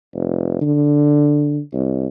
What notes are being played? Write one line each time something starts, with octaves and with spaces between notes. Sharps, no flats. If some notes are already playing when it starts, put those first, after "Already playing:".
F1
D3
C2